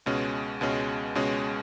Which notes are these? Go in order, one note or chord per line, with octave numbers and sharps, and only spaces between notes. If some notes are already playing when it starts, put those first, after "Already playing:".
C#2 B2 G#3 C#4
C#2 B2 G#3 C#4
C#2 B2 G#3 C#4